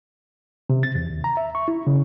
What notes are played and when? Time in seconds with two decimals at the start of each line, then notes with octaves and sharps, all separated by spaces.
0.70 C3
0.83 A6
0.95 E2
1.10 D#2
1.24 A#5
1.37 E5
1.55 C#6
1.68 E4
1.87 C#3